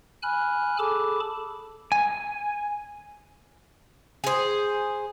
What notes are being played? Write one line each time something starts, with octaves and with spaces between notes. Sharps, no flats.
G#5 B5 F6 F#6
G#4 A4 A5 B5 D6
G#5
G#4 C5